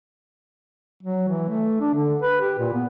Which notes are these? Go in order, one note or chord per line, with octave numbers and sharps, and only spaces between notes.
F#3
E3
A3
D4
D3
B4
G4
A#2
B3